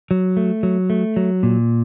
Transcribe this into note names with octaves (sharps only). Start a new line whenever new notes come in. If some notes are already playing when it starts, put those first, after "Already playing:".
F#3
A3
F#3
A3
F#3
A#2